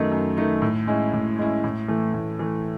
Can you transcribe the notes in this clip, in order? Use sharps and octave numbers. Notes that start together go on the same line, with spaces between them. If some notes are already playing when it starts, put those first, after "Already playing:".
Already playing: F#2 D#3 A3 D#4
F#2
D#3 A3 D#4
A2
G#3 C#4 E4
A2
G#3 C#4 E4
A2
E3 A3
A2
E3 A3